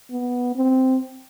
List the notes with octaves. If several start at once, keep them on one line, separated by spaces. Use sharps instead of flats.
B3
C4